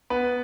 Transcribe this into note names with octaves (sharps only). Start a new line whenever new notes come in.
B3 B4